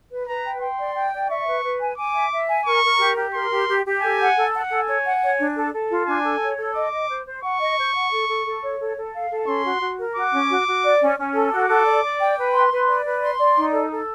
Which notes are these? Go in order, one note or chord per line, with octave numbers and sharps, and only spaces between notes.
B4
B4 A#5
G5
G5 C6
D5
G5
D5
E5 C#6
B4
B4
G#5
G#5 D6
E5
E5
G#5
A#4 C#6
A#4
G4
G4
A#4 C6
G4
G4
G4
A4 G#5
F#5
A4
F#5
A4 G#5
C#5
F#5
C#5
D4
A4
A4
F4
D4 G#5
A4
C#5
A4
D#5 D6
D#5
C5
C5
F#5 C#6
D#5
C5
F#5
A4
A4
A4
C#5
A4
A4
F5
A4
C#4 C6
F#4
F#4
A#4
F#4 D6
C#4
F#4
F#4
D5
C#4
C#4
A4
F#4 D6
A4
D5
D5
G5
B4
C6
B4
D5
B4
C6
D5
D#4
A4
A4